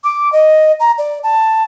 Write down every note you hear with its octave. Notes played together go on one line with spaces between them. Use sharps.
D6
D#5
A#5
D5
A5